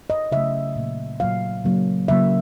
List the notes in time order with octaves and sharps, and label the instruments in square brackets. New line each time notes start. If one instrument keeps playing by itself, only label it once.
[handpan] D#5
C#3 F#3 A3 E5
A#2 F#3 A#3
A#2 F#3 A#3 F5
C#3 F#3 A#3
C#3 F#3 A#3 E5